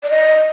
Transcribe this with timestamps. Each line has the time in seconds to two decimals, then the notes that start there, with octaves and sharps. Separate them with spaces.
0.03 D5
0.11 D#5